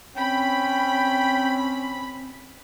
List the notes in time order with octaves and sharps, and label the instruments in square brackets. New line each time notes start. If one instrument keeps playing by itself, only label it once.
[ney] C4 [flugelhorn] C#4 [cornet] G5 [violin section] B5